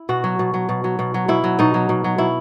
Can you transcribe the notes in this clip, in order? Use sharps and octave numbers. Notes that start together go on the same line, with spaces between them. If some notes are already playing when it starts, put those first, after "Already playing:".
Already playing: E4
B2 F#4
F#3
B2
F#3
B2
F#3
B2
F#3
B2 E4
F#3
B2 D#4
F#3
B2
F#3
B2 E4